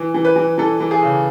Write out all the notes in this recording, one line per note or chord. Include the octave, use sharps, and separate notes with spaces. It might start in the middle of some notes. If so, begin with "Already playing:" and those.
Already playing: E3
E3
B4
E3
E3 A4
E3
G#4
C#3